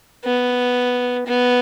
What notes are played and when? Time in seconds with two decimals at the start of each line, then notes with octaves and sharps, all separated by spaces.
0.24 B3
1.27 B3